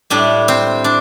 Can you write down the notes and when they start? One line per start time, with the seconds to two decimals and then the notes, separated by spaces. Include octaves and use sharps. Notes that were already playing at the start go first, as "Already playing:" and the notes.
0.10 A2 G3 D4
0.48 C4
0.84 D4